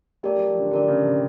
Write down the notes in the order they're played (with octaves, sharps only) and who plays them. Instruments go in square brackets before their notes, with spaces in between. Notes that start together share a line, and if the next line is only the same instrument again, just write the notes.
[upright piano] A3 [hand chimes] G4 A#4 D5
[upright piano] F#3
F3
D3
[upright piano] D3 [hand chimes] G4 A#4 D5
[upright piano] C#3
C3